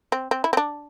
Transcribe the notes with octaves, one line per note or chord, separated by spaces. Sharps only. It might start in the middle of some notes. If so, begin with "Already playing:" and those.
C4
C4
E4
C4
D4